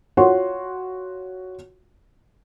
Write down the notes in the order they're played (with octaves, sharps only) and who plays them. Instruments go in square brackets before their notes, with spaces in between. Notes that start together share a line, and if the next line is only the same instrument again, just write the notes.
[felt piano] F4 F#4 C#5 F#5 C6